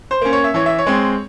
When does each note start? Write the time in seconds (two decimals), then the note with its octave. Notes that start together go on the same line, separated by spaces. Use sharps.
0.11 C5
0.21 A#3 C#4
0.33 C#5
0.44 E5
0.54 E3 C#5
0.66 E5
0.78 C#5
0.86 G#3 C4